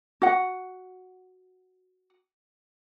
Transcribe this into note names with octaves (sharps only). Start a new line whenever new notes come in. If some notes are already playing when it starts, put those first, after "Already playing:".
F#4 F#5